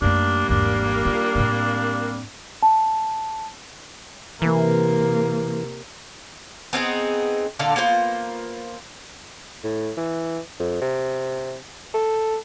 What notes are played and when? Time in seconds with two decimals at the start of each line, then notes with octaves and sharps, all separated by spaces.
0.02 F#2 G3 A3 A#3 D4
0.49 G#1 E2 D4
1.05 F4
1.35 A2 C4
2.63 A5
4.42 C3 E3 A#3
6.73 B3 C4 D#4 G#4
7.59 A#2 D3 A4 F5
7.76 A#3 B3 F4 C5
9.64 A2
9.97 E3
10.60 F2
10.82 C3
11.94 A4